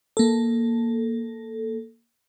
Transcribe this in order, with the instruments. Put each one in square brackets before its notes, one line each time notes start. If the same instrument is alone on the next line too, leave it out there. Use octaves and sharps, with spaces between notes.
[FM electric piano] A#3 A4